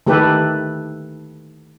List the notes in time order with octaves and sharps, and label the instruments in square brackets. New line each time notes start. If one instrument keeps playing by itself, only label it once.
[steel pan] D#3 A3 G4 A4 B4